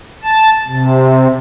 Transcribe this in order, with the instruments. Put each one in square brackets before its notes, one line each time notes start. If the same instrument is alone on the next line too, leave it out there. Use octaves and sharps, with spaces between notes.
[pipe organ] A5
C3